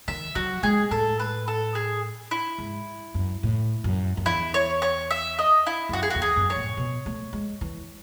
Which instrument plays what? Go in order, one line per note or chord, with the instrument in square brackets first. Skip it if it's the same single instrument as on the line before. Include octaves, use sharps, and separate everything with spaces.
[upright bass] D#3 [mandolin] E5
[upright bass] F#3 [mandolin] F#4
[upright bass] G#3 [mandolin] G#4
[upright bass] A2 [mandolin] A4
[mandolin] B4
A4
G#4
E4
[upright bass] G#2
F#2
A2
F#2
F#2
[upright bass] E2 [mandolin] E4
[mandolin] C#5
C#5
E5
D#5
E4
[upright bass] G#2
[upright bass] F#2 [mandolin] F#4
[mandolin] G#4
[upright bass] E2 [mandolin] F#4
[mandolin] G#4
[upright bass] F#2
[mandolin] C#5
[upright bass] A2
B2
A3
G#3
E3